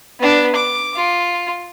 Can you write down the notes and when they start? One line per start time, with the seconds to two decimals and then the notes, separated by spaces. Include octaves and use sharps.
0.20 B3 D4
0.55 D6
0.96 F4